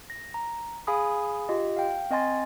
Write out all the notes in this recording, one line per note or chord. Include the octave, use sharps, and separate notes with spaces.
A#6
A#5
G#4 F5 G#5 B5 D#6
F4 G4 D#5
F5 G5
C4 D#5 G#5 C6 A6